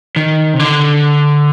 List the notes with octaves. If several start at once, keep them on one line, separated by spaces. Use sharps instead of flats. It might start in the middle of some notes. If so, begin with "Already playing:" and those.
D#3
C3
D3